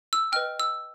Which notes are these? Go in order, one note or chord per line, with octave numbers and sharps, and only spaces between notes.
E6
B4 D#5 G5 F6
E6